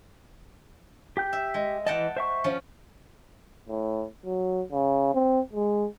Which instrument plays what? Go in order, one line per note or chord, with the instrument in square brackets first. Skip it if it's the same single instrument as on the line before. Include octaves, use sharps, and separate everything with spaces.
[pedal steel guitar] G4 G5 G6
[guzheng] E5
G#3
[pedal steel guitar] E3 D#5 [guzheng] F#5 G5 A5
[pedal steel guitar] C5 E5 C#6
[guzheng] F3 C#4
[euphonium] A2
F#3
C#3
C4
G#3